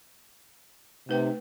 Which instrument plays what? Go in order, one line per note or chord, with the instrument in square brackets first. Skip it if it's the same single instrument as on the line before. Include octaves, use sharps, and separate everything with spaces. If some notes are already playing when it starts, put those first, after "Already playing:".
[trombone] C3 [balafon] A3 B4 G5 [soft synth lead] D#4